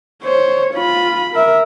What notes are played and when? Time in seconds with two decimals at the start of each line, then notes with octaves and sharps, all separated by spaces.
0.23 C5 C#5
0.74 F4 B5
1.34 A#4 E5